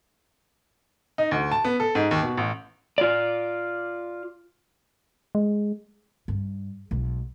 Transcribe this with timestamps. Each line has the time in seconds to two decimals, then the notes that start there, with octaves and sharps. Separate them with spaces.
1.18 D#4
1.31 D2
1.52 A5
1.65 B3
1.80 A4
1.95 G#2
2.11 D#2
2.22 B2
2.37 A1
2.98 F4 D5
5.35 G#3
6.28 G2
6.91 B1 G#3